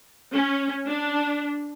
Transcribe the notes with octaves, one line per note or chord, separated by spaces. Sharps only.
C#4
D4